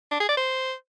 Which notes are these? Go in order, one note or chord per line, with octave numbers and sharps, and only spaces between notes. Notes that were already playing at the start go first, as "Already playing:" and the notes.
D4
G#4
D5
C5